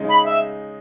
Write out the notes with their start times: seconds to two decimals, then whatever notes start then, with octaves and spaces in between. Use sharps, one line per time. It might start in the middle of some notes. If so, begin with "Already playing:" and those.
Already playing: C#3 G#3 D#4
0.09 B5
0.25 E5